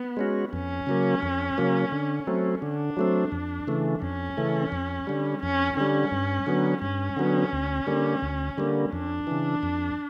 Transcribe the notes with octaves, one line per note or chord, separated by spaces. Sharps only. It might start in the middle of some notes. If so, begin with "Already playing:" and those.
Already playing: B3
G#3 C#4 F#4
F2 C#4
C#3 F#3 A#3
F2
C#3 F#3 A#3
D3
F#3 A3 C4
D3 D4
F#3 A3 C4
F2
C#3 E3 A3
F2 C#4
C#3 E3 A3
F2
D3 G3
F2 C#4
D3 G3 C#4
G2
D3 F#3 B3
G2 C#4
D3 F#3 B3
D2
D3 G3 A#3
D2
D3 G3 A#3
F2 D4
C#3 E3
F2